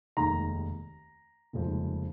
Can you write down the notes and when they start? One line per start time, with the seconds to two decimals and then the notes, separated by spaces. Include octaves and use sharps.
0.17 F1 D#2 D#3 G#3 A#5
1.53 F1 D#2 C#3 F3 G#3